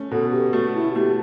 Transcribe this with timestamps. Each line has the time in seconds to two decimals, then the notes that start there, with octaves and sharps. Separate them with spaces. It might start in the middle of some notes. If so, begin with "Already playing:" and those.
Already playing: A3 C#4
0.11 B2 A4
0.32 G4
0.53 A3 F#4
0.74 E4
0.96 A3 G4